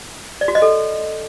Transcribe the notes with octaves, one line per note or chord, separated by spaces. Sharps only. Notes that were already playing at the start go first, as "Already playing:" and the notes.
D5
F#4
D#5
A4